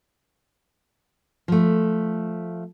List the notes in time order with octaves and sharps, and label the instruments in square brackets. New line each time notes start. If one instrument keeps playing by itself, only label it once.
[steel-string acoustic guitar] F3 A3